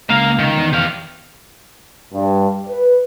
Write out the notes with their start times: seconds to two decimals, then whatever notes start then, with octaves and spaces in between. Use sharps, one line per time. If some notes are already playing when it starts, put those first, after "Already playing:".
0.09 C#2 A#3 F5
0.39 D#3
0.56 E2
0.73 G4 F5
2.14 G2
2.68 B4